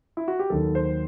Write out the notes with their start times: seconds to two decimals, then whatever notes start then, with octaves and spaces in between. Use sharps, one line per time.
0.17 E4
0.28 F#4
0.39 G4
0.50 D#2 D#3 F#3 A4
0.75 C5